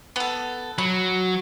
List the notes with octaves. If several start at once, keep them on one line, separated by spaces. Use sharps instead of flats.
B3 A4
F#3 B5